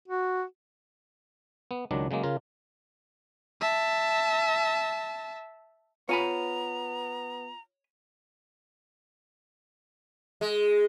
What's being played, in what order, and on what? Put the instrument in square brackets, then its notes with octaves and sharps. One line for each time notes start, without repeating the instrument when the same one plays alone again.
[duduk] F#4
[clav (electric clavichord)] B3
C#2 D#3 F#3 D4
C#3 F#3 G#3 A#3
C#3 F4 A#4
[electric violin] E5 A5
[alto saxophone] B3 [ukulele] F4 [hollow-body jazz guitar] C#5 G#5 B5 [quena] A#5
[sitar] G#3